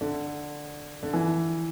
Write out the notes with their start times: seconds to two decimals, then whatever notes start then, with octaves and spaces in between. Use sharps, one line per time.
0.01 D3
1.03 D3
1.13 E3